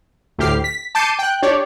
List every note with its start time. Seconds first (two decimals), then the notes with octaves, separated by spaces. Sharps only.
0.38 D2 A2 G4 F6 C7
0.64 B6
0.95 A5 D6 G6 C7 C#7 D#7
1.19 G5 F#6
1.42 D4 G4 C#5 D5